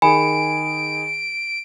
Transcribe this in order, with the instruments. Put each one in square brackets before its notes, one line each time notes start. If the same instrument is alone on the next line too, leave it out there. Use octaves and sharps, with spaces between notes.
[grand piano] D#3 G#4 [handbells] G#5 B5 [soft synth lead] D7